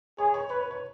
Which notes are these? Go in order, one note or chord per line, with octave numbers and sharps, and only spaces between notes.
G#4 C#5
C#5
B4 C#5
B4
C#5